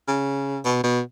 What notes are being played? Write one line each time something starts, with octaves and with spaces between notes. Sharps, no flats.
C#3
B2
B2